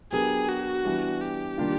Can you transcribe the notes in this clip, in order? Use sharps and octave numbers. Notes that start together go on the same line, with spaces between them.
F#3 B3 D4 G4 G#4 A#4
F#4
E3 G3 B3 D4
G4
D#3 G3 A#3 D4 F4